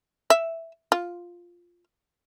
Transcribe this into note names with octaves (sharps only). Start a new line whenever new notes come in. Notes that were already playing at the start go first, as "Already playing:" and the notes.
E5
F4